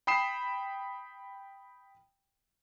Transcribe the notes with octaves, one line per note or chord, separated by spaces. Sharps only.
G5 B5 D#6 C7 E7